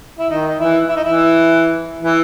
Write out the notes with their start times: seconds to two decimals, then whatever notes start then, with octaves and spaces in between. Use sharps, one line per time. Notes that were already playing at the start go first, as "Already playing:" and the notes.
0.19 E4
0.30 D#3 D#4
0.47 D#4
0.59 E3 E4
0.88 E4
0.96 D#4
1.04 E3 E4
2.03 E3 E4